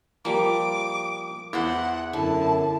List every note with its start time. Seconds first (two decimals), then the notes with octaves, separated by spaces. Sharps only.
0.25 F3 G3 A#3 D6
1.53 E2 E4 C5 F#5
2.13 F#2 D3 E4 A5